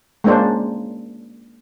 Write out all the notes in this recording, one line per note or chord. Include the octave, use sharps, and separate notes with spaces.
G#3 A#3 C#4 D4 C5